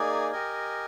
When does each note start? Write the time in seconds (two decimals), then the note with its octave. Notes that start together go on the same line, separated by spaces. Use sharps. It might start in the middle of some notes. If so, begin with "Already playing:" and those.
Already playing: A#3 D#4 G#4 D5 G#5
0.32 G4 A#4 D#5 G#5